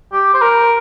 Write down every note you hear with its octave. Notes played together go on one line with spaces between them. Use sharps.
G4
C5
A#4